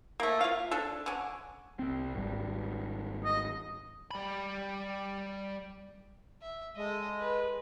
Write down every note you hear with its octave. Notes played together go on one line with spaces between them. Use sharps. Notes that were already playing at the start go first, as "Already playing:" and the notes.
A3 A#3
F4 F5
D4 A4
D3 C#4
C2 C4
G#1 G3
D#5
G3 B5
E5
G#3 A4 D#5
B4